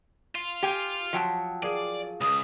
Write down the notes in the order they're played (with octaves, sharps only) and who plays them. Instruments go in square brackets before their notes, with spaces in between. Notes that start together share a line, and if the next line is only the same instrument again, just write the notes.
[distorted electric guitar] F4
[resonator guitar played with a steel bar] G4 G5 G#5
[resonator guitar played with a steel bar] F3 F#3 [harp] F#5 G5 A5
[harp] G#4 F5 [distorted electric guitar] D5
[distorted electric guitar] C#2 [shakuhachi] D#6